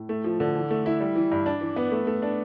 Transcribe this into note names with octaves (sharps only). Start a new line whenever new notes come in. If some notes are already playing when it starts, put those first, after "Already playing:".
Already playing: A2
A3
F3
D3
E3
A3
E4
G3
E3
G2
D4
E3
B3
A3
A3
D4